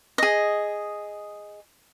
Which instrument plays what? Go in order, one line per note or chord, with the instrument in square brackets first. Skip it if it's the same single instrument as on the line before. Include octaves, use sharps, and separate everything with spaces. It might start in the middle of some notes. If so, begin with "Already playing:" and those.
[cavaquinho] G#4 D#5